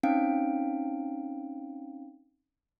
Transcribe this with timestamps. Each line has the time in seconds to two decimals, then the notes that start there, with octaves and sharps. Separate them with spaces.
0.03 C4 C#4 D#4 F5 G5 D7